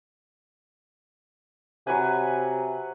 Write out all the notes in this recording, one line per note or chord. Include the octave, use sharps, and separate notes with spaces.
C3 F#3 B4 G#5